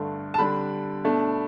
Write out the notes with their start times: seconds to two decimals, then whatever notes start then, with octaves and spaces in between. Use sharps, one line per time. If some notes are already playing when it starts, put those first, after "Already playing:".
Already playing: G2 D3 A3 D4
0.34 A5
0.38 D3 G3 D4 B5
1.04 B2 A3 D4